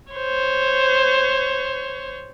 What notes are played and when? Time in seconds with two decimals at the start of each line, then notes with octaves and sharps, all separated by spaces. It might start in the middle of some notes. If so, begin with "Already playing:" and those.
0.12 C5 C#5